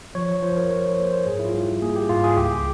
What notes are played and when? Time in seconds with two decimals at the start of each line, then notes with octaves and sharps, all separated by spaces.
0.15 F3 C#5
0.29 C#5
0.43 F3 C5
0.57 A#4
0.71 F3 C#5
0.84 C#5
0.98 A#3 C5
1.13 C5
1.26 G#2 G#4
1.39 E4
1.45 F4
1.54 G3
1.63 G4
1.82 A#3 G#4
1.96 G4
2.09 G#2 F4
2.24 G#4
2.37 C#2 G4